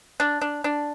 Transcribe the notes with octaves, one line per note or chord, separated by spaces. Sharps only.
D4
D4
D4